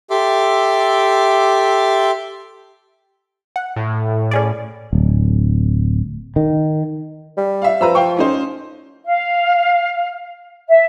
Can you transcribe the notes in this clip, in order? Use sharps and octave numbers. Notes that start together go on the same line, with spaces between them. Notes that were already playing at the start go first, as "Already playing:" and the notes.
G4 A4 E5 C6 D6
F#5
A2
C#4 G#4 D5
D1
D#3
G3
E5 F5
F3 B4 A#5 E6
F5 G5 C#6
C#4 D#4 C5
F5
E5